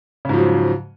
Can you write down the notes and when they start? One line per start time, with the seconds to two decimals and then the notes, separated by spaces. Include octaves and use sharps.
0.25 C#3
0.29 G#2
0.33 F3
0.38 F#3